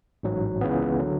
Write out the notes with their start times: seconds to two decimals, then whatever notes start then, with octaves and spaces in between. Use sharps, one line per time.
0.23 A1 G#2 F#3
0.61 C#2 C#3 E3 B3
1.00 D3 F#3